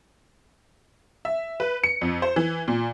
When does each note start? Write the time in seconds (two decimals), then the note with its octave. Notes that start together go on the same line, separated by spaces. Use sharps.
1.25 E5
1.60 B4
1.84 C#7
2.01 F2
2.22 C5
2.36 E3
2.68 A#2